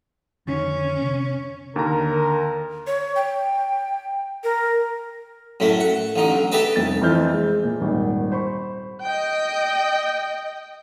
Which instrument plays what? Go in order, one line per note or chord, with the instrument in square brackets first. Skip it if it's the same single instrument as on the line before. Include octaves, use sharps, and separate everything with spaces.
[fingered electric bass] F2 D3 D#3 [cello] C#4
[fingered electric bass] C3
[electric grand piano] D#2 A#5 [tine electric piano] D3 [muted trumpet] A#4
[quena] C#5
G5
A#4
[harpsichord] F#2 A2 A3
F#5
A1 D3 D#4
B1
G4 A4 B4 D#5 E5
[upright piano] F1 C2 A6
F2 E3 C5 F6 G6
G#3
A#2
D#1 G#1
C5 B5 C#6
[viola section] D#5 G5